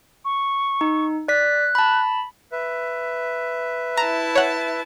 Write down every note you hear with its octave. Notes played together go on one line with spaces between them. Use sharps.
C#6
D#4
D5 F#6 B6
A5 B5
B4 E5
E4 A5 A#5
C#5 F#5